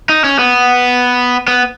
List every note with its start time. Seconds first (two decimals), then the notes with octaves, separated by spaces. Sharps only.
0.09 D#4
0.24 C#4
0.39 B3
1.48 B3